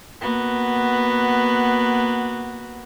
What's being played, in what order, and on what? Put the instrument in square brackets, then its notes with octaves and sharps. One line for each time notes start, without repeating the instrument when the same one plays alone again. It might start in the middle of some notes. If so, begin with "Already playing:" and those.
[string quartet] A#3 B3 F#4